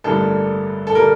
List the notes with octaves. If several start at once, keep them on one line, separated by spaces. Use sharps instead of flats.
A1 G2 D3 G3 A#3 A4
A4
D3 G3 A#3 A#4